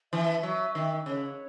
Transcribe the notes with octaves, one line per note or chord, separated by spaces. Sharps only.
E3 E5
F#3
D#3
C#3 C#5